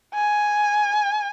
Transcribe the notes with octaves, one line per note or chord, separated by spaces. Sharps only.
G#5